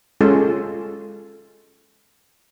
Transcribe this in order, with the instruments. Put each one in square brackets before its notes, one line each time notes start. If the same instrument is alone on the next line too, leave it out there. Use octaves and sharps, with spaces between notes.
[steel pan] G#3 C#4 F4 G#4 A4